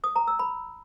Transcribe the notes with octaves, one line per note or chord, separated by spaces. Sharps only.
D#6
A#5
E6
B5